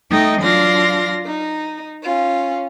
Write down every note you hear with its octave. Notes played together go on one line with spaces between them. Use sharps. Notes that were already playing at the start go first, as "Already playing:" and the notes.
A3 D#4 D#5 G5
F#3 D4 F4 F5 C6 A#6
D#4
C#4 F4